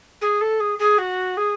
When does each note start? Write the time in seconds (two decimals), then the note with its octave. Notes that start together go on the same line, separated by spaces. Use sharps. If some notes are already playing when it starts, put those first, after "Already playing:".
0.21 G#4
0.41 A4
0.60 G#4
0.79 G#4
0.98 F#4
1.37 G#4